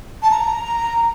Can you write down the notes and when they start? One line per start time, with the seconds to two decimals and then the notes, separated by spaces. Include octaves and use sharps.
0.23 A5
0.31 A#5